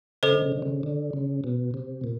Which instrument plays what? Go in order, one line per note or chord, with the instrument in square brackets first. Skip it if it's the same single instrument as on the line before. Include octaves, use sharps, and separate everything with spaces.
[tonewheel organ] C#3 [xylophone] A4 C5 D#5
[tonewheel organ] D3
C#3
D3
C#3
D3
C#3
B2
C3
A#2